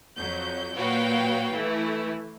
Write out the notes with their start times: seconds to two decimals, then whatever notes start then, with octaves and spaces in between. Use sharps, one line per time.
0.17 F2 F#3 G6
0.76 A#2 F#3 F#4 B4 F5 G5
1.52 E3 A3 E4